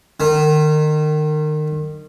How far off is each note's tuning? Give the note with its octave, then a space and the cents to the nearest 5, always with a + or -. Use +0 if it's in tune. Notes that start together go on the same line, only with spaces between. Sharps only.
D#3 -30